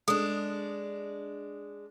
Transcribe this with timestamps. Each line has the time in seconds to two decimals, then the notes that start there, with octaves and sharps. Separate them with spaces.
0.08 G#3 D4 A4 D#6